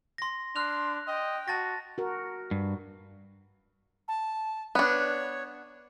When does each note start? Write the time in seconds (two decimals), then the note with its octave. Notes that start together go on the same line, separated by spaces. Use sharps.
0.18 C6 A#6
0.56 D4 C6 F6 F#6 F7
1.07 D#5 G5
1.48 F#4 A5 A6 A#6
1.98 F#4 A#4
2.51 G2
4.08 A5
4.75 B3 D4 C#5